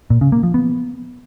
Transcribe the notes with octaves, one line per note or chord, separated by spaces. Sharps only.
A#2
C#3
A#3
F3
B3